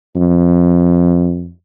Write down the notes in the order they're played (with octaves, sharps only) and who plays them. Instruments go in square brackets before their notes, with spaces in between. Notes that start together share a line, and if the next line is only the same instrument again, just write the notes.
[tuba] F2